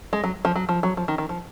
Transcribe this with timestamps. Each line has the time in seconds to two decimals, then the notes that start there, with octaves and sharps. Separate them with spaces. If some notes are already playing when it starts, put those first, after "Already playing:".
0.13 G#3
0.24 F#3
0.45 F3
0.55 F#3
0.69 F3
0.83 F#3
0.97 F3
1.08 D#3
1.18 D#3
1.29 F3